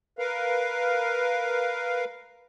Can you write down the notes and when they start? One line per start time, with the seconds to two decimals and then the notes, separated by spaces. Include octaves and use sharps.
0.19 A#4 B4 F5